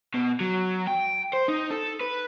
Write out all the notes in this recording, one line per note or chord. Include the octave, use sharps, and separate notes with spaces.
B2
F#3
G5
C5
D#4
A4
B4